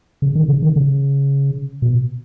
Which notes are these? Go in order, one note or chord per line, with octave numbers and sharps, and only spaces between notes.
C#3
D#3
C#3
D#3
C#3
B2